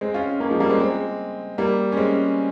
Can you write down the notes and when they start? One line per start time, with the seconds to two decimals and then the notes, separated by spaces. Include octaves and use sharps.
0.01 G#3 C4
0.14 C#4 F4
0.40 A#3 C#4
0.50 F3 G#3
0.60 G3 A#3
0.70 G#3 C4
0.80 G#3 C4
1.58 G3 A#3
1.92 C#4
1.97 G#3 C4